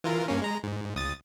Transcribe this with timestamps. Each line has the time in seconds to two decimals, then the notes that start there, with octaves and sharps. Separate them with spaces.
0.04 E3 F4 A#4
0.28 G2 A#3 C#4
0.42 G#3 A#5
0.63 G#2
0.95 C#2 D#6 A6